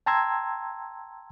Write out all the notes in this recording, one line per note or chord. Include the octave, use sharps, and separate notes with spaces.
G5 A5 A#5 C6 E6 G#6